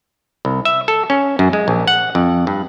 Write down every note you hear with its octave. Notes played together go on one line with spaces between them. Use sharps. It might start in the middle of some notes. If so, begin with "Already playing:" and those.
C2
E5
A4
C#4
F#2
G#3
A#1
F#5
F2
G2